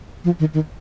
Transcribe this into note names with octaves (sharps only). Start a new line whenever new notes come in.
F3
D#3
D#3